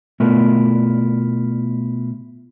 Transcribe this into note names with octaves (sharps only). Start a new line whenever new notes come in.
B2 A3 B3 E4 F4 A#4